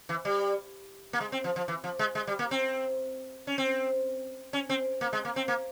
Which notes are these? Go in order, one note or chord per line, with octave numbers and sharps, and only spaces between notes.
E3
G3
A#3
G#3
C4
F3
F3
E3
F3
G#3
G#3
G3
A#3
C4
C#4
C4
C#4
C4
A#3
G#3
A#3
C4
A#3